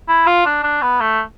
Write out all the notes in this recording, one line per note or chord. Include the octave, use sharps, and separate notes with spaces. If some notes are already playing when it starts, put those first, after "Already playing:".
E4
F4
D4
D4
B3
A3